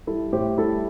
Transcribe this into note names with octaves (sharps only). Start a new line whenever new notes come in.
G3 E4 A4
A2 G4 C5
G3 E4 A4